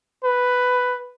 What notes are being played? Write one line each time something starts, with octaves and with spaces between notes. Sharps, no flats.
B4